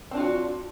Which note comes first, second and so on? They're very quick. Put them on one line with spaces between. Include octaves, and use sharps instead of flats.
C4 D4 F4 F#4